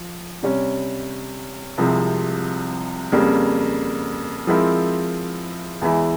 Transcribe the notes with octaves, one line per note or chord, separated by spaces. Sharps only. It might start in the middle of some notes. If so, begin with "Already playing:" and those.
Already playing: F3
C3 G3 C#4
C2 C3 F3 G#3 C4
F2 C#3 G3 A#3
F3 G#3 C4 E4 A#4
E2 E3 G#3 E4